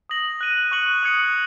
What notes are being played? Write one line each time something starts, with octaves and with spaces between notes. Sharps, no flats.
D#6 A#6 F#7
F#6 D#7 F#7
C#6 F#6 C#7 F#7
D#6 G#6 C#7 F#7